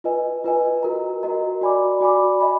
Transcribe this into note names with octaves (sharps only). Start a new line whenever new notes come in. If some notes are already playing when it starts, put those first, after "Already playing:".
F4 B4 D#5 G#5
F4 B4 D#5 G#5
F#4 A#4 D#5 A#5
F#4 A#4 D#5 A#5
F#4 D5 G#5 B5 D6
F#4 D5 G#5 B5 D6
D#5 G#5 B5